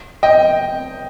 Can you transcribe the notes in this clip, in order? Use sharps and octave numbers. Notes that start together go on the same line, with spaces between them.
D#5 G5